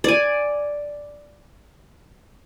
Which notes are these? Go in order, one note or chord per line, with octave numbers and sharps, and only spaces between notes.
D5 G#5